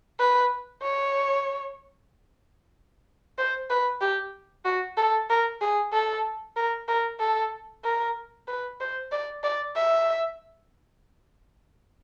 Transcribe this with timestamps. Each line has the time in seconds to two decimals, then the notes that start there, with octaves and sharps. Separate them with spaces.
0.20 B4
0.83 C#5
3.39 C5
3.70 B4
4.01 G4
4.65 F#4
4.97 A4
5.30 A#4
5.61 G#4
5.93 A4
6.56 A#4
6.88 A#4
7.20 A4
7.84 A#4
8.48 B4
8.81 C5
9.12 D5
9.43 D5
9.76 E5